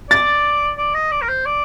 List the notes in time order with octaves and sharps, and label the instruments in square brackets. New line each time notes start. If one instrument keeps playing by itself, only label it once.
[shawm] D5 [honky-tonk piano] A6
[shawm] D5
D#5
D5
A#4
C5
D5